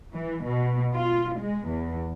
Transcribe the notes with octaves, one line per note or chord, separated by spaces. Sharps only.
E3
B2
F4
G#3
E2